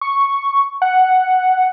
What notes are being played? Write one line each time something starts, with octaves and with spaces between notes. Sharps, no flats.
C#6
F#5